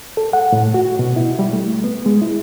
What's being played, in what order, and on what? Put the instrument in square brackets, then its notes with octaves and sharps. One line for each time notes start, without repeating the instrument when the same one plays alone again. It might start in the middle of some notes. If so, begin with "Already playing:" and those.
[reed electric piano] A4
F#5
A2
F#4
B2
E4
G3
A3
B3
G#3
E4